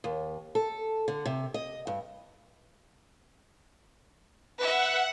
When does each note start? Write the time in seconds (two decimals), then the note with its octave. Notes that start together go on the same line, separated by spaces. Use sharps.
0.04 D#2
0.55 A4
1.08 D3
1.26 C3
1.54 D#5
1.87 G2
4.59 B4 E5 F#5